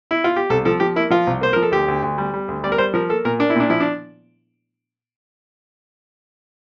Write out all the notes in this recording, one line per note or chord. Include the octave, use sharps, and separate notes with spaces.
E4
F4
G4
C2 A4
F3 A4
F3 G4
A#3 E4
F3 F4
C2
A#3 C5
F3 A#4
A4
D2 G4
D2
D2
G3
G3
D2
G3 D5
A#4
G3 C5
F3 A#4
A#3 A4
A#2 A#4
A#3 D4
E4
A#2 D4
F3 E4
D4